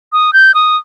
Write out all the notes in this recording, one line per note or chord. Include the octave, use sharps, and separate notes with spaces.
D#6
G6
D#6